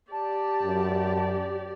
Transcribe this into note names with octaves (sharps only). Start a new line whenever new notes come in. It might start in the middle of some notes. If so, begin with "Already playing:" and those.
G4 D5 A5
F#2